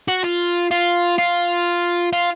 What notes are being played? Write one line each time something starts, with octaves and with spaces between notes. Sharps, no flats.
F#4
F4
F4
F4
F4